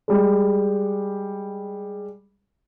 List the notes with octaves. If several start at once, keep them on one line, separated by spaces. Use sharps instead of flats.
G3 G#3